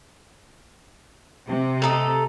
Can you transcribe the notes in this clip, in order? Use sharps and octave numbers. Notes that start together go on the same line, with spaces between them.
C3
A3 A4 D#5 A#5